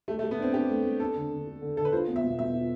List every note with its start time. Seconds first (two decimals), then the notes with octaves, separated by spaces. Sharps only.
0.08 A3 G4
0.19 A3
0.23 G4
0.31 B3
0.39 C4 D4
0.54 D4 G4
0.70 A3
0.85 A3
1.00 D4 A4
1.15 D3
1.31 D3
1.47 A4
1.62 D3
1.77 D3 A4
1.85 B4
1.92 F4 C5
2.08 B3
2.16 E5
2.23 B2
2.39 B2 E5
2.54 F4